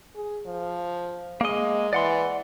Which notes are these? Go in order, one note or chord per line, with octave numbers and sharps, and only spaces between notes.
G#4
F3
G#3 A#3 D#5
E3 D5 F#5 C6